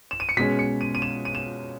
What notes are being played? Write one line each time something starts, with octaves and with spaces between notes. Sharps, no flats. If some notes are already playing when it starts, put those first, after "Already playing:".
E7
D#7
C#7
B2 G#3 C#4 B6
C#7
D#7
D#7
E7
D#7
E7